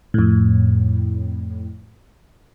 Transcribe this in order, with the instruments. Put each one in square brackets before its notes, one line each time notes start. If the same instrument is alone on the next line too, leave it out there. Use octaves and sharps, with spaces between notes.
[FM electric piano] F2 A2